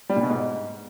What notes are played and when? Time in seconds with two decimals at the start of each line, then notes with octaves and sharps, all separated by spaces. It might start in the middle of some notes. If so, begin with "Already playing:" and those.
0.09 G3
0.16 A#2
0.23 B2
0.30 G#2